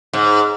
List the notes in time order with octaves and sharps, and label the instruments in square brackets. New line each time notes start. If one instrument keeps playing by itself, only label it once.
[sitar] G#2